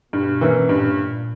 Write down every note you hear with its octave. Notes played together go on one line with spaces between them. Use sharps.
G2 B2
E3 A#3 C#4 E4
G2 A#2